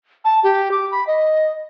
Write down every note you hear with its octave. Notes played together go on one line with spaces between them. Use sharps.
A5
G4
D6
B5
D#5